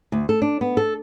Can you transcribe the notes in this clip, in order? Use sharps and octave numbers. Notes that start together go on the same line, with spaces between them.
D2
A4
D4
B3
A4